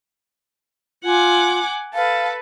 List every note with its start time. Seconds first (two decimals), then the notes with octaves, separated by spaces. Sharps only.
1.04 F4 F#5 G#5 D6
1.94 A4 B4 F5